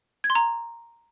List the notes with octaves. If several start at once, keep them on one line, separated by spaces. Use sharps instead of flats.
G#6
C6
A#5